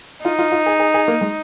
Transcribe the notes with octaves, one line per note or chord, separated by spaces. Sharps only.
D#4 F4
F4
F4
G#4
G#4
G#4
A#3
G#3